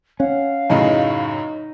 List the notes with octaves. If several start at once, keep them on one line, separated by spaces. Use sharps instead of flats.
C#4 F5 F#5
F#2 A2 C#3 D#4 D#5